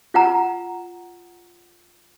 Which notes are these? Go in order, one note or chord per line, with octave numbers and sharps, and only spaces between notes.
F4 F#5 A#5